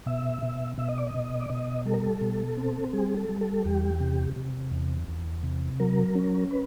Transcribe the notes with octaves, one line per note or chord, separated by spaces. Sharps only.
B2 E5
B2
B2 E5
D#5
D5
D#5
B2
D5
B2 D#5
G3 A4
A#4
A4
B2
C4
G3 G#4
A4
G3
A4
E2 G4
C3
C3
E2
E2
C3
F#3 A#4
C#4
B4